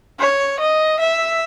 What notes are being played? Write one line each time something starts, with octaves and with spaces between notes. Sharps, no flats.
C#5
D#5
E5